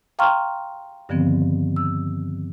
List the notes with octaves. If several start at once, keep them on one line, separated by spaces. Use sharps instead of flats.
F5 G5 A#5 C6 C#6 F6
G2 D3 D#3 F3 B3 C4
E6